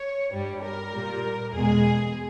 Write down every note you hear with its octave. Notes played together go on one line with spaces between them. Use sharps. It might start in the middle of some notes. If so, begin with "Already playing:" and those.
Already playing: C#5
G2 G3
A#4
A#2 G3
E2 B2 G#3 G#4